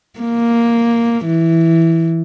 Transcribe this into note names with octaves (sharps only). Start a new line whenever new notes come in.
A#3
E3